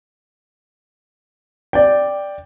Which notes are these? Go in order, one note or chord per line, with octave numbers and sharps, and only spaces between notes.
D5 G5